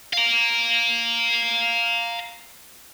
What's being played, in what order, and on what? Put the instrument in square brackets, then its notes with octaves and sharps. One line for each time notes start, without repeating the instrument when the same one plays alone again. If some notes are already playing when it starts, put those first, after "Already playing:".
[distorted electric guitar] F5 A#5